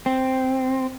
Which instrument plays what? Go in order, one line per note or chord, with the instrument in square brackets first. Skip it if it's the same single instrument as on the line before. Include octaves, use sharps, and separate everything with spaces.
[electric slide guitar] C4